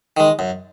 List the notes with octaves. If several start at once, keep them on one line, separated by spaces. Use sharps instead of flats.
D#3 G#3
F#2